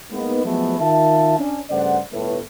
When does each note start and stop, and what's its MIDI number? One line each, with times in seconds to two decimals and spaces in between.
0.12 0.43 56
0.12 0.43 58
0.12 0.43 59
0.12 0.43 63
0.45 0.80 53
0.45 0.80 54
0.45 0.80 56
0.45 0.80 57
0.45 0.80 59
0.80 1.36 51
0.80 1.36 65
0.80 1.36 76
0.80 1.36 81
1.39 1.59 61
1.39 1.59 62
1.70 1.99 43
1.70 1.99 49
1.70 1.99 57
1.70 1.99 72
1.70 1.99 74
1.70 1.99 78
2.12 2.38 31
2.12 2.38 45
2.12 2.38 57
2.12 2.38 71